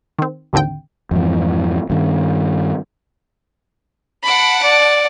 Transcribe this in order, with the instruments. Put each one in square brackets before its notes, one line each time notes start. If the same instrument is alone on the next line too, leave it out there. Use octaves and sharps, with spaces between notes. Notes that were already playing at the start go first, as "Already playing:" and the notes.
[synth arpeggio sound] D#3 C4
A1 D#2 D3 C4 G5
[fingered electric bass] F2 G#2 E3
G2 D#3
[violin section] F#5 A5 D7 [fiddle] B5
[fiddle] D5